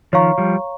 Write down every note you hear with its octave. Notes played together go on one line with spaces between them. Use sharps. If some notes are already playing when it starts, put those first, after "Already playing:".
D#3 F3 C#5 F5 A#5 C#6
F3 G3